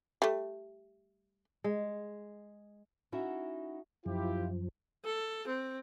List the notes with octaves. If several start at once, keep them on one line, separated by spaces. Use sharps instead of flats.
G3 A3
G#3
C#4 D#4 E4 F#4 E5 F#5
F#2 F3 E4 F4 G4
A4
C4